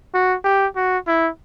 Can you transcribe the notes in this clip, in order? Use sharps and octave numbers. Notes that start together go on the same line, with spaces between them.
F#4
G4
F#4
E4